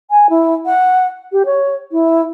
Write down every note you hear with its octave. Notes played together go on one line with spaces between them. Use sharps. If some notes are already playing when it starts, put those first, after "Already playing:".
G#5
E4
F#5
G4
C#5
E4